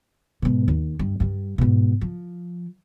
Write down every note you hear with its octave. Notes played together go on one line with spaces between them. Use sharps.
G#2 B2
D#2
G2
G2 G3
G#2 B2
F3